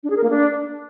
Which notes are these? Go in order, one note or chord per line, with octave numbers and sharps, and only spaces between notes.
D4
G#4
A#4
A#3
D4